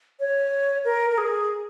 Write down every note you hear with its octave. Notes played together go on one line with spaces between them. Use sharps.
C#5
A#4
A#4
G#4